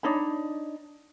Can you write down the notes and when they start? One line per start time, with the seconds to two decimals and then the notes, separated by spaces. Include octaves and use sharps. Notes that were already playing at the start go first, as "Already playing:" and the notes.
0.03 D4 D#4 C#5 B5